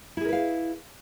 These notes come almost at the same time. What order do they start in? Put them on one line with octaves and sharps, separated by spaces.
E4 G#4 A#4 B4 F5